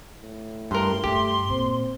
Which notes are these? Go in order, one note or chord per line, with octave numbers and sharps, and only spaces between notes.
A2
G2 A#4 C6
G2 A3 G4
A#2 C4